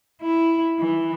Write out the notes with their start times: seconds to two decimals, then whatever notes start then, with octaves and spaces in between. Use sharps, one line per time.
0.22 E4
0.79 E3